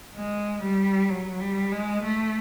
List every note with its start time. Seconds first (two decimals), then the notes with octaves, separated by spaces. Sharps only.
0.16 G#3
0.63 G3
1.09 F#3
1.40 G3
1.71 G#3
2.03 A3